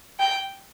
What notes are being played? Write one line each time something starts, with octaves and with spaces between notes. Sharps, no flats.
G5